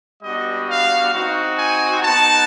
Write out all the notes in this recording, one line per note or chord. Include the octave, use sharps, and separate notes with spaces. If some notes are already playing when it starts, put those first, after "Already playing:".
G3 B3 D4 F#4 D#5
F5
C4 D#4 F#4
G#5
B3 D#4 F#4 A5